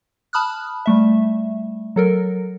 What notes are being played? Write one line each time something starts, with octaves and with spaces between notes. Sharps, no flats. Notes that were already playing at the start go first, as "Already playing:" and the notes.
A5 B5 D#6 F6 F#6
G3 A3 E5
F#3 A4 A#4